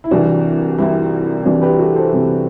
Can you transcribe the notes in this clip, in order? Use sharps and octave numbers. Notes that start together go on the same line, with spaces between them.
E4
C2 C3 E3 D4 F#4
C2 C3 E3 C4 E4
C2 C3 E3 D4 F#4
G4 B4
F#4 A4
A4 C5
C2 C3 E3